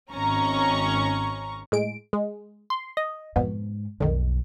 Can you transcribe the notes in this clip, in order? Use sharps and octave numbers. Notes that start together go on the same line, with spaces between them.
G#1 C#4 A#5 C#6
A2 G#3 D7
G#3
C6
D#5
F2 G#2 B2 B3
B1 F2 D3 D#3